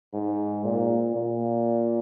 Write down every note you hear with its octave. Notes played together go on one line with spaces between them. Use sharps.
G#2
A#2
A#2